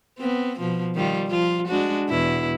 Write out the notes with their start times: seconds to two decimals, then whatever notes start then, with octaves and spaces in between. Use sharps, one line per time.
0.18 B3 C4
0.59 B2 F3
0.95 D#3 G3 F4
1.27 F3 F4
1.68 G#3 D4 F#4
2.09 E2 B2 E4